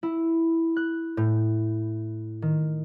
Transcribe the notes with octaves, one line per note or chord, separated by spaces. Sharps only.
E4
F#6
A2
D#3